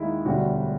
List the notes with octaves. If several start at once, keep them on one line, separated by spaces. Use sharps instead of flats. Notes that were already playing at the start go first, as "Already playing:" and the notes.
Already playing: D#2 D#3 G#3 D#4 E4
E1 D2 D3 G3 F#4